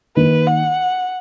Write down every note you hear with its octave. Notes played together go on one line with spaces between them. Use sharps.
D#3 A#3 D#4 B4
F#5